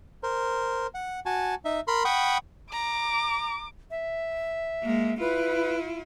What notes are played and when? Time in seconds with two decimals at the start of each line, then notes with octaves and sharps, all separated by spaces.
0.23 A#4 C5
0.94 F#5
1.26 F#4 G#5 A5
1.65 D#4 E5
1.88 A#4 B5 C6
2.05 F#5 G5 B5 C#6 D#6
2.72 A#5 D6
3.91 E5
4.82 G#3 A#3
5.20 E4 F4 B4